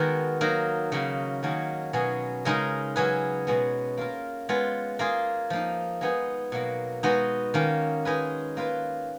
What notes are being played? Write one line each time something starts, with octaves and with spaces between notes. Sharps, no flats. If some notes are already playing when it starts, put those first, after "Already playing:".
Already playing: D#3 G#3 B3 F#4 A#4
F#3 A#3 D#4 A#4
C#3 F#3 A#3 D#4 F#4
D#3 F#3 A#3 C#4 G#4
B2 F#3 C#4 G#4
C#3 G#3 D#4 A#4
F#3 C#4 G#4 B4
B2 G#3 B3
A#3 F4 A#4
G#3 B3 F4 B4
A#3 F4 G#4
F3 A#3 D#4
G#3 B3 D#4 G#4
B2 F#3 A#3
G#3 B3 D#4 F#4
D#3 A#3 C#4
G#3 D#4 G#4 B4
A#3 F4 B4